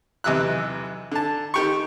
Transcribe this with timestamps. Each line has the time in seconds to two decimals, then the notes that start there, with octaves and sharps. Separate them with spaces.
0.24 B1 E2 C3 E6 F#6
1.12 D3 A5
1.54 D#3 G4 C#6